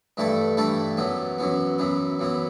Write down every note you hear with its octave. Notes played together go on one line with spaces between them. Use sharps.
G2 E3 A3 E4 A4
G2 E3 A3 E4 A4
F#2 E3 B3
F#2 E3 B3
F#2 E3 B3
F#2 E3 B3